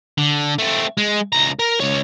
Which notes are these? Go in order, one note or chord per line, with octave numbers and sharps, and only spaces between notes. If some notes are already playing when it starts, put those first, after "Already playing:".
D3
A3 C4
G#3
C#2 A#5
A#4
C#2 C#5